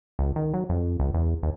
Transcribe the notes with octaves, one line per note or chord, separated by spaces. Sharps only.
C#2
D#3
F#3
F2
C#2
E2
D#2